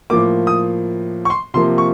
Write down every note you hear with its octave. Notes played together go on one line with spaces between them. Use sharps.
A2 F3 A#3 D6
D#6
C#6
C6
C3 F3 A#3 C6
C#6